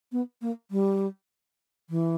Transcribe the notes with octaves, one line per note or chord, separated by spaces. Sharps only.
B3
A#3
G3
E3